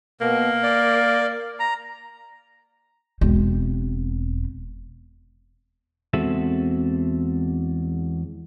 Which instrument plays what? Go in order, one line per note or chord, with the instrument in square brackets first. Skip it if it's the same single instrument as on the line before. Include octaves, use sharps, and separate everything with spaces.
[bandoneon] B2 [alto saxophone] A#3
[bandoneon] D5
A#5
[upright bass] E1 C4
[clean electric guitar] E2 G#3 C4 F#4 A4 E5